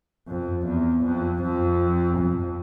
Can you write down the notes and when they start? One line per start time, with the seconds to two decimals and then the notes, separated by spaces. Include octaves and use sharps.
0.29 F2
0.66 E2
1.04 F2
1.42 F2
2.18 F2